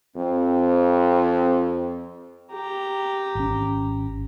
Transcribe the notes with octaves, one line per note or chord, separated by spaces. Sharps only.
F2 C4
G4 A#5
G#1 C#4